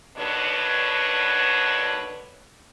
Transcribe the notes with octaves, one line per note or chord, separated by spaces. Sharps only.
D#2 B2 D3 D4 B4 C#5